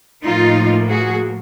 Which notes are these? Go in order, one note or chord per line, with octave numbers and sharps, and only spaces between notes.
A2 F3 A#3 D#4 F4
F#4 G#4